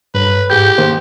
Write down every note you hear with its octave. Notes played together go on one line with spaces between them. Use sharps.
G2 B4
G#2 G4 G#4 G6
D#3 A#3 C5